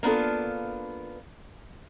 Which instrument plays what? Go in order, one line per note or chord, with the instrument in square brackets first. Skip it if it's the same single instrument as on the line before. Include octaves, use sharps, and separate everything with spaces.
[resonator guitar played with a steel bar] A#3 B3 D4 F4 A4